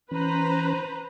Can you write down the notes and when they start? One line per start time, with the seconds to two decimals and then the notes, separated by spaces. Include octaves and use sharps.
0.11 E3 C#4 B4 C5 A#5